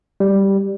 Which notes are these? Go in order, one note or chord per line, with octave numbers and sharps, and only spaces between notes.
G3